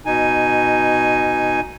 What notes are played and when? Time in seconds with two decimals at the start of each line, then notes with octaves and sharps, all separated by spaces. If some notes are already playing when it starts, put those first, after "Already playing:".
0.06 B2 D#4 G#5